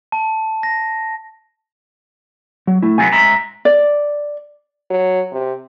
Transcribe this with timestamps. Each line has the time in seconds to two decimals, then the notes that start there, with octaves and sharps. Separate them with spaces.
0.12 A5
0.63 A#6
2.67 F#3
2.82 A3 E4
2.98 C3 F#3 B3 G#5
3.13 G#2 E5 A#5
3.65 D5
4.90 F#3
5.32 C3